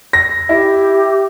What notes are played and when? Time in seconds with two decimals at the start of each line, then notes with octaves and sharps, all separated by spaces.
0.13 A#6
0.49 E4 G4